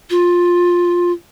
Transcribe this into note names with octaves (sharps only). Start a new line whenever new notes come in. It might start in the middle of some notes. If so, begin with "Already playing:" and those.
F4